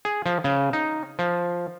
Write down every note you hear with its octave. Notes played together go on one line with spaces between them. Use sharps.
G#4
F3
C#3
D#4
F3